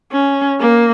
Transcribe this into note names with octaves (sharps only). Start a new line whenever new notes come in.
C#4
A#3